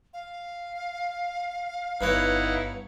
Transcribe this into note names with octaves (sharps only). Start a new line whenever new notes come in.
F5
G1 G2 B3 D#4 E4 C#5 F#5